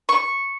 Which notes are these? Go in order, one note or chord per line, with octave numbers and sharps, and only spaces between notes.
C#6